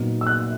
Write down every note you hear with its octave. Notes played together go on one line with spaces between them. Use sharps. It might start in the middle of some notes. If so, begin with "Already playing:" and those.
Already playing: A#2 F#3 B3 D#4
E6
F#6